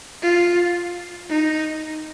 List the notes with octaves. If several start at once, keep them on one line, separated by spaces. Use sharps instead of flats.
F4
D#4